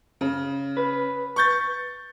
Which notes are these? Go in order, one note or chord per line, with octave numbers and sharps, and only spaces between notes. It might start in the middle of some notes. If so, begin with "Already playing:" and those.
C#3
B4
C#6 G6 A6